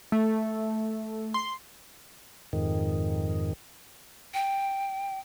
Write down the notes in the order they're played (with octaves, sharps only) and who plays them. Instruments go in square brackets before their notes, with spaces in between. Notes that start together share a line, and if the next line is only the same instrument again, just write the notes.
[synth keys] A3
C6
[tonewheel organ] F2 G#2 D#3
[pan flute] G5